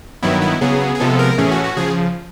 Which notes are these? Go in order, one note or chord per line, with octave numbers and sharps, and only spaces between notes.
G2 D#3 F#3 B3 E4
E4
C#3 F#3 B3 G#4
G#4
C3 F3 G#3 B3 A4
A#4
A2 E3 A3 C#4 G#4
F#4
F#4
C#3 F3 G#4